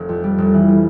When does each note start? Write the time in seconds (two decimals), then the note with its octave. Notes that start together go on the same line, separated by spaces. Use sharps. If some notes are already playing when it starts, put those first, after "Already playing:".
Already playing: F1
0.09 F2
0.24 G3
0.38 F1
0.54 E3
0.68 G3